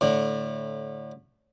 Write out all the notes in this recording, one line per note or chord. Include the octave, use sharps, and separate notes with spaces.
A2 D3